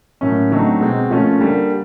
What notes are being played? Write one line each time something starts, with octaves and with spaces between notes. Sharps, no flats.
A2 F#3 A#3 C#4
D3 F#3 A3 C4 D#4
B2 G#3 C4
A#2 F3 A3 C#4 F4
D3 G3 A#3